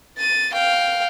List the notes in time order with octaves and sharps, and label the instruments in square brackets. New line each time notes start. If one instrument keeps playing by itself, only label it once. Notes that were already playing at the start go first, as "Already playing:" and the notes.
[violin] A6 D#7
F5 G5